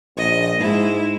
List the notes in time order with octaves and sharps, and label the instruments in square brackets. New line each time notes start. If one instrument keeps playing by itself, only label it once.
[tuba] A#1 [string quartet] D#5
[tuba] G#2 [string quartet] G#3 E4